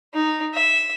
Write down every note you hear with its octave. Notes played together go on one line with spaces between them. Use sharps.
D#4
E5